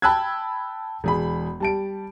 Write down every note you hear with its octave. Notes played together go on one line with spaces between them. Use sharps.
G5 A5 B5 E6 F#6 G#6
E1 G#4 B5
G3 A5 D7